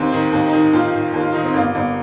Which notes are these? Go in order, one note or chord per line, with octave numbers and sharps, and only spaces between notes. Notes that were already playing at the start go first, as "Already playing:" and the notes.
Already playing: D#2 C4
D#3
D#2
D#4
D#3
D#2 F4
D#3
D#2
F4
D#3 D#4
C4
G1 A#3
G1